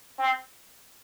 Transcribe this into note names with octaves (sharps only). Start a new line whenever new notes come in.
C4